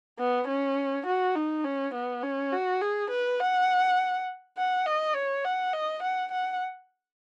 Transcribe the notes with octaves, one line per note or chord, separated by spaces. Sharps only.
B3
C#4
F#4
D#4
C#4
B3
C#4
F#4
G#4
B4
F#5
F#5
D#5
C#5
F#5
D#5
F#5
F#5